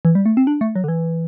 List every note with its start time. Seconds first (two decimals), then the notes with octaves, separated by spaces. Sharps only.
0.05 E3
0.15 G3
0.26 A3
0.37 C4
0.47 D4
0.61 A3
0.75 F#3
0.84 D3
0.88 E3